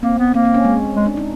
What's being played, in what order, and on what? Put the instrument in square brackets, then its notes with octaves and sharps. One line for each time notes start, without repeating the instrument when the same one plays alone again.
[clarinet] A#3 [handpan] C4
[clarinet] B3
[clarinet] A#3 [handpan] C4
[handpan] C4
C#4
G#3
[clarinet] G#3
[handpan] D4
D#4